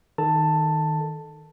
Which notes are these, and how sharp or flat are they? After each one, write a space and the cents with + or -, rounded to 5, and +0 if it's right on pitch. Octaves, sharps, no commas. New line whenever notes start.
D#3 +0 A4 -15 A5 +10